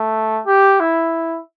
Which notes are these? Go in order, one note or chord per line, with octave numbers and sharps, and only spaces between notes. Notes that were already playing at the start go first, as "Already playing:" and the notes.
Already playing: A3
G4
E4